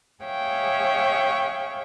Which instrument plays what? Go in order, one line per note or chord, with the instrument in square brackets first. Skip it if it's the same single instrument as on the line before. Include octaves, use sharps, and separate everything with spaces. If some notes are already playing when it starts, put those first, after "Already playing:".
[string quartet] G#4 C#5 E5 F5 G5 C#6